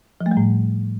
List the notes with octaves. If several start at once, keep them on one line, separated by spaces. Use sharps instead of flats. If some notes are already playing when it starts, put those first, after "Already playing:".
F3
A3
G3
A2